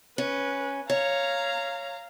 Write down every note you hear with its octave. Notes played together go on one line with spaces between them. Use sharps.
C#4 B4
C#5 F5 A#5